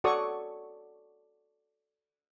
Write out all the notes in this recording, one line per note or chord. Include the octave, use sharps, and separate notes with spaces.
F#4 A4 C#5 D5 C#6 D#6